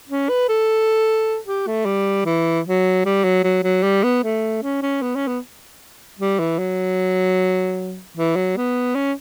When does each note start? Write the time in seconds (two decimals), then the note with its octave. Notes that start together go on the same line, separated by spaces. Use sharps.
0.09 C#4
0.29 B4
0.49 A4
1.47 G4
1.67 A3
1.86 G3
2.25 E3
2.66 F#3
3.05 G3
3.24 F#3
3.44 F#3
3.63 F#3
3.83 G3
4.04 B3
4.23 A3
4.63 C#4
4.82 C#4
5.02 B3
5.16 C#4
5.28 B3
6.19 G3
6.39 E3
6.59 F#3
8.17 E3
8.36 F#3
8.57 B3
8.95 C#4